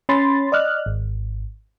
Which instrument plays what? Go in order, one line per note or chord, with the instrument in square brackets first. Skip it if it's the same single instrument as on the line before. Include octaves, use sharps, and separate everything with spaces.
[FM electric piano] C#4 B5 C6 A6
D5 D#5 F6 F#6
G#1